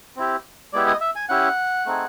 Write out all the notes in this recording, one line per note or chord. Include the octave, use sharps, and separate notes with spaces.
C4 E4 G4
G#3 B3 E4 G4 D5
D#5
E5
G#5
C#4 E4 G4 F#5
A3 C4 D#4 G#4